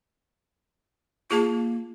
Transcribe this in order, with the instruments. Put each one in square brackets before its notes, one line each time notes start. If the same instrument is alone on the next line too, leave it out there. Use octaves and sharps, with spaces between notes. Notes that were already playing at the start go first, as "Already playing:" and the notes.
[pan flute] A#3 [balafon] F4 G#4 A5